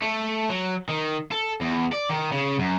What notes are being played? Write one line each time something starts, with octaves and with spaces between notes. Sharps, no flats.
A3
F#3
D#3
A4
E2
D5
D#3
C#3
F#2